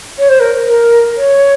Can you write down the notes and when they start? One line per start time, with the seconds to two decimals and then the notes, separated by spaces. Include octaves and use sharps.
0.19 C#5
0.29 C5
0.40 A#4
0.65 A#4
1.17 C#5